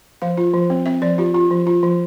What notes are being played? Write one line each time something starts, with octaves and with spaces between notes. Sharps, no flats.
F3 F5
F4
F3
C4
C4 E5
F3 D5
F4 G4
F4
F3
F4
F3